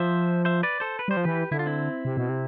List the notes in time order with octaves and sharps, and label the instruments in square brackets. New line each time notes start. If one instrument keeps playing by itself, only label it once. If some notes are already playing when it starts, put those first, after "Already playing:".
Already playing: [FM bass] F3 [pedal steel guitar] C5 E5
[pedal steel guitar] C5 E5
B4 D5
A4 C5
B4
[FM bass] G3 [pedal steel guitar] C5
[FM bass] F3
[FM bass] E3 [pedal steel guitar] G4 B4
[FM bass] D3 [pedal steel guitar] E4
[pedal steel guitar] F4
C4 E4
[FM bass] C3
B2
C3